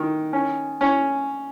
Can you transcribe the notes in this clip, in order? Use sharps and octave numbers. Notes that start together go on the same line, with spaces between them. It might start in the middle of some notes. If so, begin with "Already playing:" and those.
Already playing: D#3
C#4
C#4